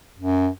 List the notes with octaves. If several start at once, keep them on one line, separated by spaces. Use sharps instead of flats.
F#2